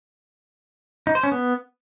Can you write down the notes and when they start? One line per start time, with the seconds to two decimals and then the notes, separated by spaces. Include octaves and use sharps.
1.07 D#4
1.15 C5
1.23 C#4
1.32 B3